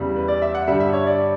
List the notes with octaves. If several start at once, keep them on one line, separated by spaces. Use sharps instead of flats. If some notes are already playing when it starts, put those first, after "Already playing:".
Already playing: E2 C#3 G3
B4
D5
E5
F#5
G2 D3 G3 E5
E5
C#5
D5